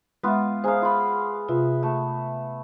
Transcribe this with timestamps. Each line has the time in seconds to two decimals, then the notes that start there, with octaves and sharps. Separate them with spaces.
0.24 G#3 B3 F4 E5
0.64 G#4 C5 E5 F5 G#5 A#5
0.82 F4 B5
1.49 C3 F4 B4 E5
1.83 A3